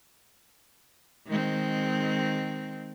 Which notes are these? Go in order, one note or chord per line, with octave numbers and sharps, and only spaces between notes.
D#3 G#3 C4